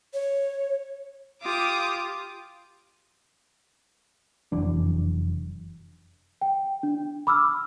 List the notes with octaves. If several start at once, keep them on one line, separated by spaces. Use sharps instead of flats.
C#5
F4 G4 D6 D#6
F1 F#2 E3 D4
G5
D4
B5 D6 E6 F6